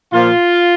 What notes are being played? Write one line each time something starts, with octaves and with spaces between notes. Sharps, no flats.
A#2 F3 F4